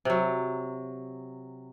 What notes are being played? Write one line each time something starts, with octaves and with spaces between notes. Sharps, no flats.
C3 F#3